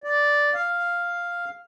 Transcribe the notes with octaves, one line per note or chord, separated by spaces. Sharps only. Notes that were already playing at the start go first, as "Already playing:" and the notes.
D5
F5